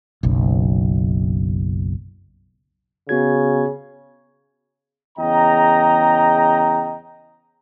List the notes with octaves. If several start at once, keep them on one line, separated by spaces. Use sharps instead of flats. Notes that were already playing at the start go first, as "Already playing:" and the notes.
F#1 B1
C#3 B3 F#4 G#6
E2 C#3 D#5 G5 A#5